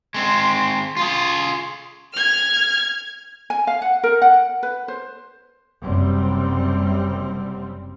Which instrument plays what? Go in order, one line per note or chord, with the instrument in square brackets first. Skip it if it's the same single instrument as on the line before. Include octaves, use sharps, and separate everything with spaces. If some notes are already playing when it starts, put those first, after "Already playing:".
[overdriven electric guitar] G#3 C4
F4 G#4
[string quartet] F6 G#6
[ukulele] G#5
F5
F#5
A#4
F#5
B4
C5
[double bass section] F#1 F#2 C3 G3 C4